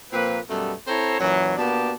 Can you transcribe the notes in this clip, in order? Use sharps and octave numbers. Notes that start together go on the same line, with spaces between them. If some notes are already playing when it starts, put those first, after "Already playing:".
A#2 F3 A#3 C4 B4
F#2 B2 G3 A3 B3 A4
C4 E4 A4 C5 C#5 A#5
F#2 A#2 E3 F#3
B2 A#3 B3 D4 G4 A5